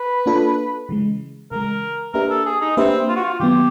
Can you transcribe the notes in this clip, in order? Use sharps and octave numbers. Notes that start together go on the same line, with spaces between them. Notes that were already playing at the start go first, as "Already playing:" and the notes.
Already playing: B4
A#3 D4 F4 A4
C#3 E3 G#3
C#3 E3 G#3 A#4
A#3 D4 G4 A#4 B4 E5
A4
G#4
D#4
A#3 C4 D4 G4 B4 E5
F4
F#4
F4
D#3 F#3 B3 G4